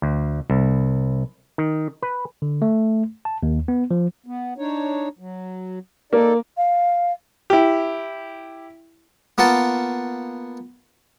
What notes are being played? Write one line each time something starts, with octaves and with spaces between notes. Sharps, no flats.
D2
C2
D#3
B4
D3
A3
A5
D#2
B3
F3
B3
D4 D#4 C#5
F#3
A#3 D#4 A4 D5
F5
E4 G4
A#3 B3 F4 F#5 A5